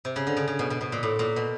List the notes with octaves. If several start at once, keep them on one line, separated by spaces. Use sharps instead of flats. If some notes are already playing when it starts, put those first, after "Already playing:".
C3
C#3
D3
C#3
C#3
B2
B2
B2
A#2
A2
A#2
B2